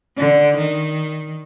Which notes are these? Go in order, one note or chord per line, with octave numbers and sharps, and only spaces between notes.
D3
D#3